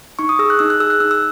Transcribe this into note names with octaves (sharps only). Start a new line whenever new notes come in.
D#4 C#6
D#6
G#4 E6
F#6
D#4 E6
F#6
G#4 E6
F#6
D#4 E6
E6